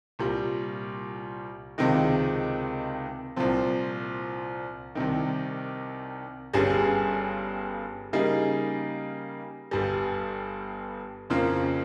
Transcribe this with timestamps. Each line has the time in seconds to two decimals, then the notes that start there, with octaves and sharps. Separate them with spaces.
0.19 C2 A#2 G3
1.78 C#2 C3 D#3 G#3
3.36 C2 A#2 F3 C4
4.95 C2 C3 D#3
6.54 G1 G2 G3 C#4 G#4
8.13 C#3 G3 A#3 D#4 G#4
9.71 G1 G2 G3
11.30 F2 C#3 F3 A#3